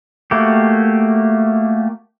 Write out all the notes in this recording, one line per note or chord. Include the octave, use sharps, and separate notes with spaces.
A3 A#3 F#4 G4